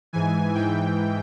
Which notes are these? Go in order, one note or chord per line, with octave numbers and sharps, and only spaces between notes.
G#2 E3 G#5
G#2 E3 G5